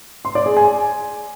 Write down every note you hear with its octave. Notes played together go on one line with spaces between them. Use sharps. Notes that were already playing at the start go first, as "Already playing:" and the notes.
C6
D5
G#4
G#5